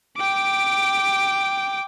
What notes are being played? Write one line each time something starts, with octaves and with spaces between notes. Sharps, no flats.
G5 D6